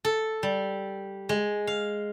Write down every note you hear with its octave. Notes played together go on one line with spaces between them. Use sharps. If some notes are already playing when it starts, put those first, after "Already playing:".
A4
G3
G#3
F5